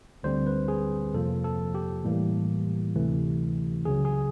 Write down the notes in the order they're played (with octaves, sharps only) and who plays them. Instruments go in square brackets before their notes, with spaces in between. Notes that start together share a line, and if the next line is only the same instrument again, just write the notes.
[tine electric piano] D2 D3 G3 C4 C5
B4
G#4
F2 C3 F3 A#3 A4
A4
G4
A2 E3 G3 A#3
D2 C3 E3 A3
C#2 C#3 F#3 G#4
G#4